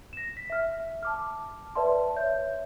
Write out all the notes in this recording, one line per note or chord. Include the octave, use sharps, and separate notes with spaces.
A#6 E7
B6
E5 F6
A5 D6 F6
B4 D5 E5 A5 C6
C#5 E5 G6